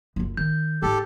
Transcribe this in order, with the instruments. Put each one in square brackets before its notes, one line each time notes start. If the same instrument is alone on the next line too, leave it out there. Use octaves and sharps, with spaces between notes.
[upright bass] F#1 F4
[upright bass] D#3 [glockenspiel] G6
[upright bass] G#2 [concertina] G4 A4